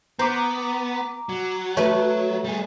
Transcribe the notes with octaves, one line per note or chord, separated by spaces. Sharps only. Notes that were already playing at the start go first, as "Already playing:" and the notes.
B3 C5 A#5 D6
F#3
A3 B4 C#5
G3 G#4